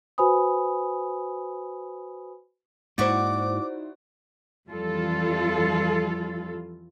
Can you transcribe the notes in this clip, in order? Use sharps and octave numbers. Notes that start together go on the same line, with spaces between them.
F#4 B4 C5 G#5 B5 D#6
G#2 A#3 D#4 E4 F#4 C5 D5 D6
F2 E3 G3 F4 A4